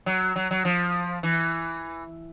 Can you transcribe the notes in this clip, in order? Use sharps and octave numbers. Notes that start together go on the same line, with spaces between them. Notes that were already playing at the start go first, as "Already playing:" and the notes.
F#3
F#3
F#3
F3
E3